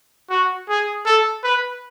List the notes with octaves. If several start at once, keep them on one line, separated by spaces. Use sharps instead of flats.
F#4
G#4
A4
B4